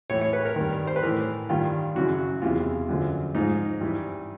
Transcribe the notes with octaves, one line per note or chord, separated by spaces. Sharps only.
A2 E3 C#5
C#5
B4
A#4
D#3
G2
C5
B4
A2 E3 A#4
G2 D#3 F4
F#2 C#3 E3 F#4
E2 C3 E3 F4
F#2 D3 F3
G#2 F3 D#4
G2 E3